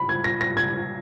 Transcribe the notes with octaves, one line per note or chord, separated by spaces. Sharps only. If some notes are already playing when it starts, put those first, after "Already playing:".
Already playing: B5
G#6
A#6
A#6
G#6